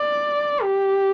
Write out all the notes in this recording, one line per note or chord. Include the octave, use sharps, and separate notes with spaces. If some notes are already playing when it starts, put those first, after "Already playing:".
Already playing: D5
G4